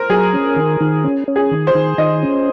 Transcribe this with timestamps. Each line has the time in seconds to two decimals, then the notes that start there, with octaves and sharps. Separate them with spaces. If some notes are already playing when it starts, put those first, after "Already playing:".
Already playing: A#4 C5
0.10 F#3 G#4
0.33 C#4
0.56 D#3
0.81 D#3
1.04 C#4
1.28 C#4
1.36 G#4
1.51 D#3
1.67 C5
1.75 D#3
1.98 D#3 D#5
2.23 C#4